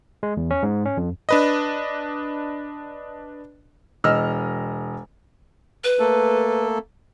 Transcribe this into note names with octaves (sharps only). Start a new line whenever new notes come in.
G#3
E2
C#4
G#2
C#4
F2
D4 B4 D#5
E1 D#5 E6 F6
B4
A3 A#3 A4